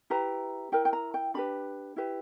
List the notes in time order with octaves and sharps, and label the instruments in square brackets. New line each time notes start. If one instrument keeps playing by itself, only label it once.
[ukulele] E4 G4 B4 A#5
E4 A#4 G5
G5
A#5
G5
D4 G4 B4 B5
E4 G4 B4